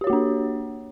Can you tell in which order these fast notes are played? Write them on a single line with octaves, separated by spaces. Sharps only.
G4 C#5 F#4 A#3 D4